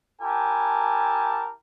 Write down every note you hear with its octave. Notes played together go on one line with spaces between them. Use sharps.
E4 G4 A#4 G#5 A5